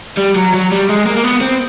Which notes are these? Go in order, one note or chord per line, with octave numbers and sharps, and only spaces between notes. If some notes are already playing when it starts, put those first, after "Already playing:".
G3
F#3
F#3
G3
G#3
A#3
A#3
B3
C4